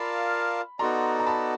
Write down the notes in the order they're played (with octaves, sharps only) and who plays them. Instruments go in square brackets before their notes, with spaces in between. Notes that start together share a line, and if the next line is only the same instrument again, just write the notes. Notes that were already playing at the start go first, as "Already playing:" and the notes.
Already playing: [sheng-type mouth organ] F4 A#4 D5 F5 A5 [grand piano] B5
[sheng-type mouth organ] B3 D#4 F#4 A4 D5 [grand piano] A#5 C6
[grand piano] A#5
A5 B5